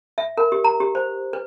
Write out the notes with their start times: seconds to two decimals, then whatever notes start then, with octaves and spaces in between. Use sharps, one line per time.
0.18 E5
0.37 A#4
0.52 G4
0.64 A#5
0.80 G4
0.95 C5
1.33 B4